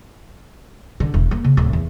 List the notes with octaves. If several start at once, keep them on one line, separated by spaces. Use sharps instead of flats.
D3
E1
A#3
C#3
D1
E2